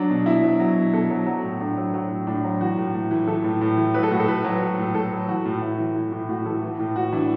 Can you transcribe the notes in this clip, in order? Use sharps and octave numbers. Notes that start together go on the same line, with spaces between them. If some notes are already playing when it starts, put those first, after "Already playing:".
Already playing: F#3 D4
B2
B2 E4
F#3
F#3
B2
B2 A4
F#3
F#3 F#4
A2
A2 D4
F#3
F#3
A2
A2 D4
F#3
E3 F#4
A2
A2
E3
E3 A4
A2
A2
E3
F#3 B4
A4
A2 F#4
A4
A2 B4
F#3
F#3
A2
A2 A4
F#3
E3 F#4
A2
A2 E4
E3
E3
A2
A2 F#4
E3 A4
E3
A2
A2 F#4
E3 D4